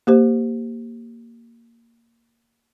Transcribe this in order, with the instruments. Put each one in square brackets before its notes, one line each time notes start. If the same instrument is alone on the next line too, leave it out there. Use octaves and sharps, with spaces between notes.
[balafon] A#3 G4 C5